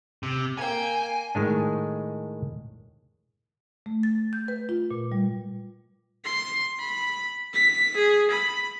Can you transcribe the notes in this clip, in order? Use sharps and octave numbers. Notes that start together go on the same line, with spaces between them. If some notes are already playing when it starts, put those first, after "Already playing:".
C3
A#3 G5 G#5
A2 D#3 G#3 D4
A3
A6
G6
B4
F4
A#2
G3
C6
B5
B6
G#4
B5